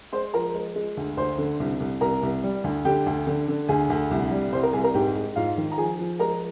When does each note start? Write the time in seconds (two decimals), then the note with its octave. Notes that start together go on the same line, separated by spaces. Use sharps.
0.13 G#3 C5 C6
0.33 F3 A#4 A#5
0.55 G#3
0.76 G#3
0.97 D2
1.17 D2 C5 C6
1.38 D3
1.60 C2
1.80 C2
2.01 C2 A#4 A#5
2.23 C2
2.44 G3
2.64 D2
2.85 D3 G4 G5
3.06 D2
3.27 D3
3.48 D3
3.69 D2 G#4 G#5
3.90 D2
4.11 C2
4.31 G3
4.52 C2 C5 C6
4.63 A#4 A#5
4.73 C2 G#4 G#5
4.84 A#4 A#5
4.94 G#2 G4 G5
5.16 G#3
5.36 G#2 F4 F5
5.58 D#3
5.72 A#5
5.78 F3 G#4 G#5
5.99 F3
6.20 G#3 A#4 A#5